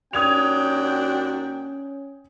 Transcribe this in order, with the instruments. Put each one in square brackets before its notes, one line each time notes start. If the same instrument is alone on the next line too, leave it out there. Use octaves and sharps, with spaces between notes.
[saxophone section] D#2 D4 F#4 [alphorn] C#4 [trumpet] G5 [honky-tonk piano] D#6 G#6 F7